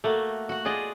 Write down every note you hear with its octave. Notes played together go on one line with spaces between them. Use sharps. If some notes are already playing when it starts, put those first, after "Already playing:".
A3 A#3 F#4
F#4 F#5
F4 G#4 D5 D#5